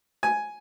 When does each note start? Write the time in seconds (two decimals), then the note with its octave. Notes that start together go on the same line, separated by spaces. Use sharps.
0.23 G#5